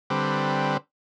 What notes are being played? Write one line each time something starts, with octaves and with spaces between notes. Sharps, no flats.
D3 G3 C4 B4